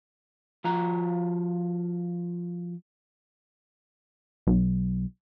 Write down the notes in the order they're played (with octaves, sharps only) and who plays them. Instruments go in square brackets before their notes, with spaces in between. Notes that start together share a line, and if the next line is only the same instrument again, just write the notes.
[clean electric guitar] F3 F4 F#4 A#5
[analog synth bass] B1